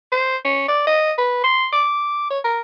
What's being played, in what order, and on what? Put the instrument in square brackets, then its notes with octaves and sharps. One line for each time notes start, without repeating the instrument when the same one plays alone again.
[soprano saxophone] C5
C#4
D5
D#5
B4
C6
D6
C#5
A#4